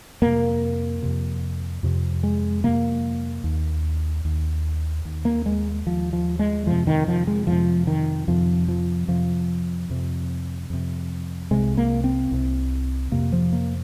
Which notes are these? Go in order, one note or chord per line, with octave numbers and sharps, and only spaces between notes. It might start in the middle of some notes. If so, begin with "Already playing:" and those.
F2 C3 A#3
F2 C3
F2 C3
G#3
F2 C3 A#3
D#2
D#2
D#2
A#3
G#3
D#2 F3
F3
G#3
F2 C3 F3
D#3
F3
G#3
F2 C3 F3
D#3
F2 C3 F3
F3
F2 C3 F3
F2 C3
F2 C3
C2 C3 G#3
A#3
C4
C2 C3
F2 C3 A#3
F3
A#3